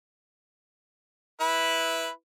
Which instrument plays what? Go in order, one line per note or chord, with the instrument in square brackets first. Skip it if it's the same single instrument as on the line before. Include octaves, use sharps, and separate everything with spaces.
[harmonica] E4 B4